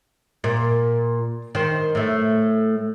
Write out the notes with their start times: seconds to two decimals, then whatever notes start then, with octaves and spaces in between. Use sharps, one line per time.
0.44 A#2
1.55 D#3 C5
1.95 A2 A3